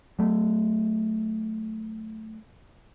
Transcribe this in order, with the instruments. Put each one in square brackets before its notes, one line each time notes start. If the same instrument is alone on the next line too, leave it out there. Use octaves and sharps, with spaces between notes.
[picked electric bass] F#3 A3